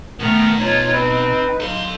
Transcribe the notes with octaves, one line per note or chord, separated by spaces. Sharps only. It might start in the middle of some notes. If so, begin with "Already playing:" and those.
B2 D#3 A3 B3 A#5
D#4 F4 C#5
C4 B4
A4 F5 C6